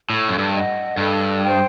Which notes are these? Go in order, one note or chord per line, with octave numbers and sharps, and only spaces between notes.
A2 A4
F#2
G2
D#5 F#5
G2 A4
C5 G5